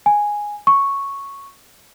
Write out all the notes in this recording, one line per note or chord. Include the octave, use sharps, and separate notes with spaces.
G#5
C#6